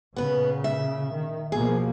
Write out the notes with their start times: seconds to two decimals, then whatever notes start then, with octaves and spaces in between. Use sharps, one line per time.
0.16 A#2 C#3 B3 B4
0.64 E5
1.13 D#3
1.52 B2 F3 A#3 G#4